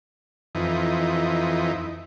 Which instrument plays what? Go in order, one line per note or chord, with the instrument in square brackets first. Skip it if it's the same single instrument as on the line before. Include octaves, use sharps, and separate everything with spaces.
[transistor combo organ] F2 E3 D#4